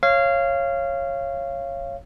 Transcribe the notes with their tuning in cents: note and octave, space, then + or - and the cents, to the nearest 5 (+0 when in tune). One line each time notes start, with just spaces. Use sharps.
C#5 -15 F5 -20